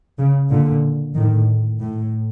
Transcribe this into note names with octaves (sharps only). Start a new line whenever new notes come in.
C#3
A#2 D3
A2 D#3
A2